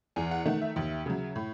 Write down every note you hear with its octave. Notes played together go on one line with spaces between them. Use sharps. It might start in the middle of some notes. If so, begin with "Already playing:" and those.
E2 G#5
F#5
D#3 A3 F#5
E5
D#2
C#3 F#3
A2